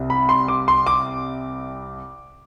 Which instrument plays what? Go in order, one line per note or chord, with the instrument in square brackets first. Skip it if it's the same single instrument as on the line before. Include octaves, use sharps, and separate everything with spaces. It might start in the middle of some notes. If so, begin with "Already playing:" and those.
Already playing: [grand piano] C2 C3
B5
C6
D6
C6
D6